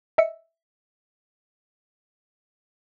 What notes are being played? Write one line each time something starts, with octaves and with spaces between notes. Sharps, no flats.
D#5 E5 E6 C#7